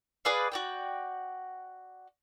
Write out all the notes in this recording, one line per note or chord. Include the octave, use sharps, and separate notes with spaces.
G#4 B4 D5 F5
F#4 D5 G5